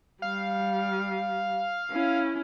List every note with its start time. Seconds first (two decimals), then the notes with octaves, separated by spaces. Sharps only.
0.22 G3 F5
1.91 C#4 E4